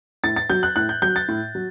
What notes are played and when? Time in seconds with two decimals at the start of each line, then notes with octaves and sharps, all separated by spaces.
0.24 A2 A6
0.36 A6
0.50 F#3 G6
0.63 F#6
0.76 A2 F#6
0.89 G6
1.02 F#3 G6
1.16 A6
1.28 A2
1.55 F#3